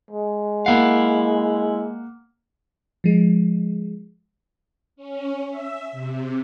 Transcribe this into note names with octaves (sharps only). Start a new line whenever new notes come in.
G#3
A#3 E4 F5 F#5
F3 G#3
C#4
E5
C3